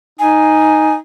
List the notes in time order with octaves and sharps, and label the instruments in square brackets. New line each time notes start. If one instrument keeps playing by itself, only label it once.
[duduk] D#4 [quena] G#5